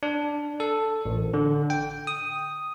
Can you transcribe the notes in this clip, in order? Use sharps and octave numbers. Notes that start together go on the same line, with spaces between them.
D4
A4
A1
D3
G5
D#6